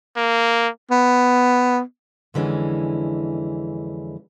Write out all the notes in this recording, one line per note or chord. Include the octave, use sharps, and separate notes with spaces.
A#3
B3
F2 D3 E3 G#3 C#4